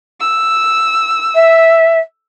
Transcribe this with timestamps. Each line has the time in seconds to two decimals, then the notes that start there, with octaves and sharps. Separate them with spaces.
0.20 E6
1.34 E5